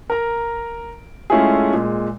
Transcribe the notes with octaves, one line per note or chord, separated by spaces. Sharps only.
A#4 A#5
G#3 A3 C#4 E4 F4 G#4
A#2 G#3